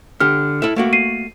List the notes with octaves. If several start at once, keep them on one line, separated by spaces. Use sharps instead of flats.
D3 G4 F6
E4 A4 E5
A3 A#3 F#4
C7 D#7